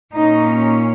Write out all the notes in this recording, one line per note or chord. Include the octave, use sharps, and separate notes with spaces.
A#2 A#3 C#4 D#4